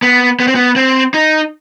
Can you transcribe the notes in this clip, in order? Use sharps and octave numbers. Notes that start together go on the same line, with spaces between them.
B3
B3
C4
B3
C4
D#4